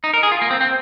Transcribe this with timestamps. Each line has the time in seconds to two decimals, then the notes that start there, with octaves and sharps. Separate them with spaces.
0.04 D#4
0.14 A#4
0.23 G#4
0.32 F4
0.42 A#3
0.51 C4
0.61 C4